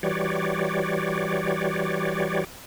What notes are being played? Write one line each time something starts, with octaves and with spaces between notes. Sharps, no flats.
E3 G3 F#4 G4 C#5 D5